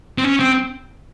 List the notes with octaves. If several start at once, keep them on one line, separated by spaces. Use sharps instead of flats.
C4
C#4
C4